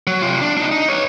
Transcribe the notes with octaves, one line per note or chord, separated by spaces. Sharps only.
F#3
C3 F4
D4
D4 D#4
D#4
B4 C#5